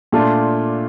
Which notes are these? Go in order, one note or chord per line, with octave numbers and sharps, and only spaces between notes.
A#2 A3 D4 F4